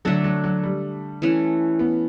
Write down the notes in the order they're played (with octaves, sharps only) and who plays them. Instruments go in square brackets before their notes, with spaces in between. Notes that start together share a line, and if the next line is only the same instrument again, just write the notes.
[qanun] D3 A3 D4 A4 [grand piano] F#3
[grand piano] F#3
F#3
G3
[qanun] E3 A3 C#4
[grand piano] B3